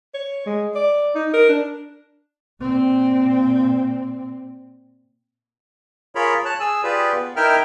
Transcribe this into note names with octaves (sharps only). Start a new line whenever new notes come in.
C#5
G#3
D5
D#4
A#4
D4
A#2 C4
F4 G#4 A#4 C#5 B5
C#5 A5 F#6
G#4 G#5 E6
F4 G4 G#4 B4 D5
B3
D#4 E4 A#4 E5 G5 F6